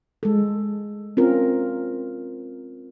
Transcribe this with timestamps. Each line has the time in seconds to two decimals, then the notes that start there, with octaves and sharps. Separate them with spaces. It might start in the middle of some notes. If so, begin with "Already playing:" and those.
0.23 G#3 A4
1.17 C4 C#4 F4 A#4